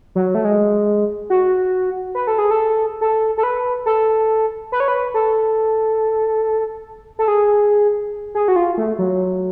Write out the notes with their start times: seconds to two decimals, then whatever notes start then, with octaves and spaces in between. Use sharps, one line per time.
0.15 F#3
0.35 A3
0.45 G#3
1.30 F#4
2.15 B4
2.27 A4
2.38 G#4
2.51 A4
3.01 A4
3.38 A4
3.43 B4
3.86 A4
4.72 B4
4.80 C#5
4.88 B4
5.14 A4
7.19 A4
7.28 G#4
8.35 G#4
8.48 F#4
8.56 F4
8.78 A3
8.99 F#3